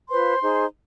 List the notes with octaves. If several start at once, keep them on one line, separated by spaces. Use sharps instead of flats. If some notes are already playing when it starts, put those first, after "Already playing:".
F4 B4 C5 C6
D#4 G#4 C5